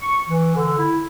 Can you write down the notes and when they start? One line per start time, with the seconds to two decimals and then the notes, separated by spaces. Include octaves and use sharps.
0.01 C#6
0.28 E3
0.56 D3
0.78 E4